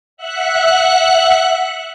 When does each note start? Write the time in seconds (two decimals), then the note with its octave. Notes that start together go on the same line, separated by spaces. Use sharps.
0.17 E5 F#5 F#6